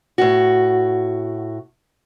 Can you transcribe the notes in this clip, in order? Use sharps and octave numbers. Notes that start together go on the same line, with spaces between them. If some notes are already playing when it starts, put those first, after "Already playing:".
A2 F#4